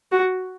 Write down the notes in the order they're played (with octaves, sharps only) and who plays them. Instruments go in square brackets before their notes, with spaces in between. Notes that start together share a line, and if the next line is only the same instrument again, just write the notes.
[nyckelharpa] F#4